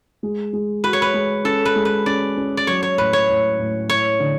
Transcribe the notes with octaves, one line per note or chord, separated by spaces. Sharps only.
G#3
G#3
F#4 B4
C#5
B4
G#3
C#4 A4
B4
G#3
B4
C#4 D5
C#4
D5
F#3 C#5
C#5
A2 B4
C#5
A2
A2
E4 C#5
D3